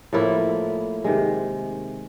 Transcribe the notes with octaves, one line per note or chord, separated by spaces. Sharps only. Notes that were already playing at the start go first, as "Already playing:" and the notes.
A2 F3 A#3 E4
C3 D#3 G#3